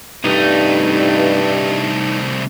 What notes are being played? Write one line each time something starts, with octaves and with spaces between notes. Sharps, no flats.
C2 G2 A3 D#4